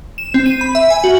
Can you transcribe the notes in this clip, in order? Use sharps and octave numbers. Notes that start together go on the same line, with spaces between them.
E7
C4
D#7
B5
E5
G#5
F#4